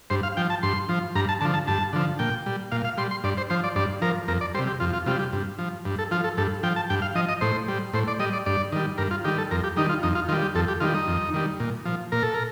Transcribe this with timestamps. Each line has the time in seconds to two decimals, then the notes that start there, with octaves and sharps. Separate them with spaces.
0.10 G2 C5
0.23 F5
0.37 F3 G5
0.50 A5
0.63 G2 C6
0.89 F3
1.15 G2 A#5
1.29 A5
1.41 D3 F3 A5
1.54 A5
1.67 G2 A5
1.93 D3 F3
2.19 A#2 G5
2.46 G3
2.72 A#2 F5
2.84 F5
2.97 G3 C6
3.11 C6
3.24 G2 D5
3.37 C5
3.50 F3 C5
3.64 D5
3.76 G2 D5
4.02 F3 A#4
4.28 F2 A#4
4.41 D5
4.54 G3 C5
4.59 C3
4.67 G4
4.80 F2 F4
4.93 F4
5.06 C3 G3 F4
5.19 G4
5.33 G2
5.59 F3
5.85 G2
5.99 A4
6.11 F3 F4
6.24 A4
6.37 G2 A4
6.63 F3 G5
6.76 A5
6.90 G2 G5
7.02 F5
7.15 F3 D#5
7.29 D#5
7.41 A2 C5
7.68 G3
7.93 A2 C5
8.08 D5
8.19 G3 D#5
8.33 D5
8.46 G2 D5
8.72 D#3 G3
8.98 G2 A#4
9.11 F4
9.25 D#3 G3 G4
9.38 A4
9.51 F2 A#4
9.64 G4
9.77 D#3 G3 D#4
9.89 F4
10.03 F2 D#4
10.15 F4
10.29 D#3 F4
10.32 G3
10.42 G4
10.55 F2 A4
10.68 G4
10.81 D#3 G3 F4
10.94 D#4
11.07 F2
11.34 D#3 G3
11.60 A#2
11.85 F3
12.12 A#2 A#4
12.23 A4
12.34 A#4